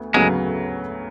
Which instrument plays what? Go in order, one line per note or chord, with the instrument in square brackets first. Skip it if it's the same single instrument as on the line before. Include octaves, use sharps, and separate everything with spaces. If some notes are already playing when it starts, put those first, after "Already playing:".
Already playing: [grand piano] D2 B3
[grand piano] D2 C#3 F#3 B3 [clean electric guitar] G#3